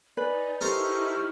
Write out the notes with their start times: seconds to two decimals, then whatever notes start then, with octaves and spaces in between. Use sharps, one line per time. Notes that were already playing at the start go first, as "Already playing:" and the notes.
0.17 D#4 B4 D5 G#5
0.61 D#4 E4 G4 A4 A#4 C5 C#6 F6